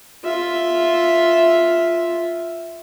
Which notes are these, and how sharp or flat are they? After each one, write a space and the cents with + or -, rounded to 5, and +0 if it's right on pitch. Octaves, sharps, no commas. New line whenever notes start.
F4 +0 E5 +0